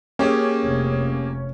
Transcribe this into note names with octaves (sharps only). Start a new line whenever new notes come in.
A#3 C#4 G4 G#4
F1